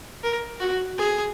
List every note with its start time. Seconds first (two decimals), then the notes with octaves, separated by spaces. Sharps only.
0.24 A#4
0.61 F#4
0.98 G#4